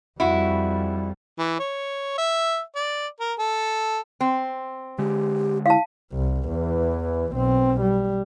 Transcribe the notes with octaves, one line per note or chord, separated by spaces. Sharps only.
F2 G3 E4 F#4
E3
C#5
E5
D5
A#4
A4
C4
D3 G#3 G4
E4 F5 A5
C2
E2 E3
B1 C4
G3